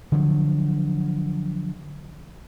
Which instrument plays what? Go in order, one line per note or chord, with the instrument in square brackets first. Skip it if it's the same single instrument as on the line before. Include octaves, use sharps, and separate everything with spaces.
[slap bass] D3 F3 F#3